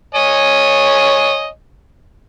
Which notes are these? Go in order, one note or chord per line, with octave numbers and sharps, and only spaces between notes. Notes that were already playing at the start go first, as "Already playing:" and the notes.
C#5 D#5 G#5